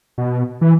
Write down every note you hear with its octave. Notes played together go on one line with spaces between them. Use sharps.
B2
E3